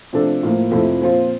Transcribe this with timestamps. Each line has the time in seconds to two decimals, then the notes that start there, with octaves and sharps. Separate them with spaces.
0.13 C3 F3 A3 D4 A4
0.43 A2 F3 A#3
0.71 F2 C3 F3 A3 E4
1.01 A#2 F3 C4 F4